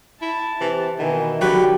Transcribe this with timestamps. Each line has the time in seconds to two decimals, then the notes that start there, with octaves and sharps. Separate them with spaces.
0.21 E4 A5
0.61 C3 E3
0.99 B2 D#3 E3
1.41 D3 F#3 G4 B4